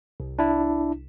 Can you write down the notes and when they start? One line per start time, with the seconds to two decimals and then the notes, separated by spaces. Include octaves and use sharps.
0.20 C2
0.39 D4 E4